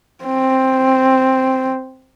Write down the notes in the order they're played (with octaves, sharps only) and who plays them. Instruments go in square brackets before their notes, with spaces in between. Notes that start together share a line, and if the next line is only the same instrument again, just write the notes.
[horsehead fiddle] C4